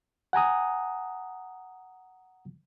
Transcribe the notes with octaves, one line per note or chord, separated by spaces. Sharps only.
F#5 G#5 A#5 D#6